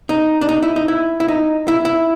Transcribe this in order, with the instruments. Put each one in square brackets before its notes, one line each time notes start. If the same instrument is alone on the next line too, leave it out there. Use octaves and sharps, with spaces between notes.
[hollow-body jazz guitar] D#4
D4
D#4
E4
D#4
E4
E4
D#4
E4
E4